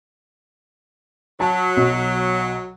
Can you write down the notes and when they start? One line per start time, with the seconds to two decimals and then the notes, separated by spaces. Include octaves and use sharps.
1.40 F#3 A5
1.77 B1